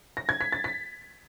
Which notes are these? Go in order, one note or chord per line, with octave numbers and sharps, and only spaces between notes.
A#6
G#6
B6
A6
B6